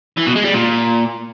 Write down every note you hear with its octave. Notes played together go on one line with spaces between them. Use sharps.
E3
B2
G#3
G3
A#2